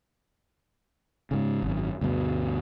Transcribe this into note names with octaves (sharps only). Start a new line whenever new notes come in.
G#2 C#3
G#1 F#2
D2 G2 B2